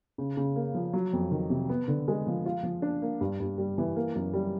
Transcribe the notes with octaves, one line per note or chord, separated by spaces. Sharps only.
C#3
C#3
A#3
F3
F#3
F2
D#3
C3
B3
D3
G#3
F3
F4
F3
D4
A#3
G2
G2
G3
E3
A#3
F#2
G3